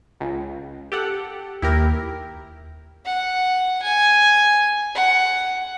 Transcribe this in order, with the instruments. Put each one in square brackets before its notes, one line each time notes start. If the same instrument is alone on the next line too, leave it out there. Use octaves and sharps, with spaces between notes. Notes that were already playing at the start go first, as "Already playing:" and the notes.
[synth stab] C#2
G4 A4 F#5
[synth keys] D#2 [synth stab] E4 G4 A#4
[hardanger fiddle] F#5
G#5
F#5